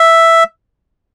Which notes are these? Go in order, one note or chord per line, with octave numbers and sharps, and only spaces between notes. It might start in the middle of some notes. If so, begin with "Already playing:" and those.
Already playing: E5